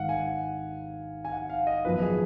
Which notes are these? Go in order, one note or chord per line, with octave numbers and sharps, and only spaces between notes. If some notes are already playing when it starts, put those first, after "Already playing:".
Already playing: G#1 G#2 D#3 F5 F#5
G#5
F#5
G#5
F#5
F5
D#5
G#1 F#2 F3 B3 B4
G#4